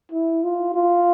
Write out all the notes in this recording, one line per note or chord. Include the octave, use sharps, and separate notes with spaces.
E4
F4
F4